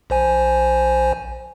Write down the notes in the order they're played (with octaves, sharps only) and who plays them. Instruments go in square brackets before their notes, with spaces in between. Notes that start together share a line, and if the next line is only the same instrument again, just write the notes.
[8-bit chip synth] A#1 C5 G#5